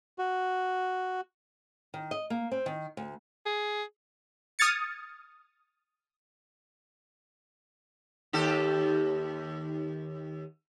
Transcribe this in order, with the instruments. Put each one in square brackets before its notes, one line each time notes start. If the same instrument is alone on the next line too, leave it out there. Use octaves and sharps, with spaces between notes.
[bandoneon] F#4
[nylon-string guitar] D#3
D#5
A#3
C4
D#3
D2
[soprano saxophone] G#4
[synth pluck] D#6 F6 G#6 A6 C#7
[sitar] D#2 G4 A4